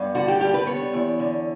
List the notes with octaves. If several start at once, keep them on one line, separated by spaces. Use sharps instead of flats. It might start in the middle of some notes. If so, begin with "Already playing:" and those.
Already playing: G2 B3
D3 F#4
G4
G3 G4
B4
B3 C#5
E2
D3